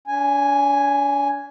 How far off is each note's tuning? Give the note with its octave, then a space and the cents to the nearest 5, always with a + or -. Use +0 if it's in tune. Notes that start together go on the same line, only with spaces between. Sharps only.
D4 -45 G#5 +0